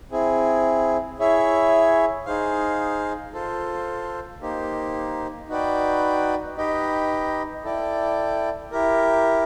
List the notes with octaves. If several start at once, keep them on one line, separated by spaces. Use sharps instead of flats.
C4 E4 G#4
E4 G#4 C#5 E5
D#4 G#4 C5 F5
F4 A4 C5
A#3 D#4 G4 C5
D#4 F#4 B4 D5 G5
D#4 G4 B4 D#5 G5
E4 A4 D5 G5
E4 G4 A#4